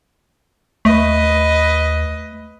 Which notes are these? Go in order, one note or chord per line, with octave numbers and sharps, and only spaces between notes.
D#2 A3 B4 D#5